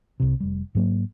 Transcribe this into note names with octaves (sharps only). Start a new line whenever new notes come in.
C2 C3
F1 G3
G#2 F#3 A#3